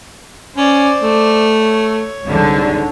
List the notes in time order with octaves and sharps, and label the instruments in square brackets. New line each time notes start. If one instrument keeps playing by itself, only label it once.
[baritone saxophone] C#4 [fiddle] C5 D5
[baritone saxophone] A3
[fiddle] C#5
[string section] C2 D3 [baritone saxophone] G#2